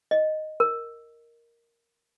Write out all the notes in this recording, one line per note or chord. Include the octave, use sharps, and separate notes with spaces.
D#5
A#4